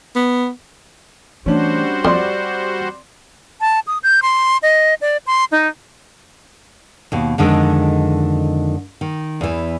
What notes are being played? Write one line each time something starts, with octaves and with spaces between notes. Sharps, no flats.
B3
E3 G3 A3 C#4 D4 F#4 C5
F2 C4 D5 C6
A5
D#6
G6
C6
D#5
D5
C6
D#4
D#2 B2
F2 D3 D#3 G#3
D#3
E2 E3